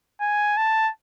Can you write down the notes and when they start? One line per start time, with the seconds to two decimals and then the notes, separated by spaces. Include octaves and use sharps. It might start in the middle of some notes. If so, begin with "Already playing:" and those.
0.21 G#5
0.57 A5